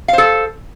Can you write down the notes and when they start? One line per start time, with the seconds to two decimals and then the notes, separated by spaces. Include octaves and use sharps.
0.08 F5
0.13 C5
0.18 A4